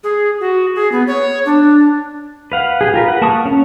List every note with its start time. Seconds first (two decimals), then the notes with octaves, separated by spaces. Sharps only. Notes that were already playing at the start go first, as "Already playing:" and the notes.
0.04 G#4
0.40 F#4
0.75 G#4
0.92 B3
1.07 C#5
1.46 D4
2.52 B4 F5 F#5
2.81 G4 G#4
2.94 F4 A#4 B4
3.08 F#5
3.22 A#3 A5 C#6 D#6
3.45 C#4